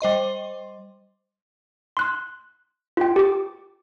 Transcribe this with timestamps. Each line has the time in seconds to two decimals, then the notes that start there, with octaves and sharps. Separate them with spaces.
0.01 G3 C5 D#5 C6
1.97 C6 F#6
2.97 F4 G5
3.16 G4 D6